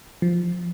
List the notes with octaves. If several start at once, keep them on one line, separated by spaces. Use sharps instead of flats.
F3